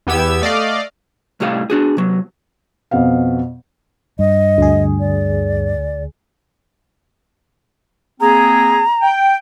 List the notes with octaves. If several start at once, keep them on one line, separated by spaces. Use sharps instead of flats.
E2 B3 G4 E6 G#6
A3 D5 D#5 F5
C2 A2 G3 G4 D#5 F5
D4 F#4 G#4
C3 F#3
F2 B2 B3 F5
G2 D#5
D2 G#4
D5
A#3 C4 G#4 A#5
G5